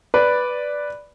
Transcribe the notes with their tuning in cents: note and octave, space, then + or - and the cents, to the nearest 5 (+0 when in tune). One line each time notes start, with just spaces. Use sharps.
B4 +0 D5 +0